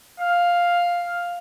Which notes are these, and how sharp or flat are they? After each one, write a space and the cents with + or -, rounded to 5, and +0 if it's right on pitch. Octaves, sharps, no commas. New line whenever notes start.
F5 +5